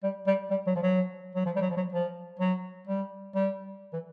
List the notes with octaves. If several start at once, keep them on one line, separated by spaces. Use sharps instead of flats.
G3
G3
G3
F#3
F3
F#3
F#3
F3
G3
F#3
F3
F#3
F3
F#3
G3
G3
E3